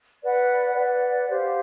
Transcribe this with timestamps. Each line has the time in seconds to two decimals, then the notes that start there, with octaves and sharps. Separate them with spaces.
0.22 B4 D5 F#5
0.75 B4 D5 F#5
1.29 G4 C5 F5